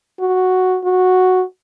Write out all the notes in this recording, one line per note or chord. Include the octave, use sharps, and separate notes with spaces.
F#4
F#4